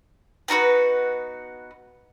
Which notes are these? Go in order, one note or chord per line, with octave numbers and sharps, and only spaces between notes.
B3 D#4 F#4 B4